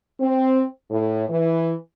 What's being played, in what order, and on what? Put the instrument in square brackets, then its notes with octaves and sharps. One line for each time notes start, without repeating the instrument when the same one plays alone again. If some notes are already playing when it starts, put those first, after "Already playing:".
[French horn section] C4
A2
E3